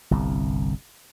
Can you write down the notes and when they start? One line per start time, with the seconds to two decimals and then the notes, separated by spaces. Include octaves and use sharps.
0.11 G1 C2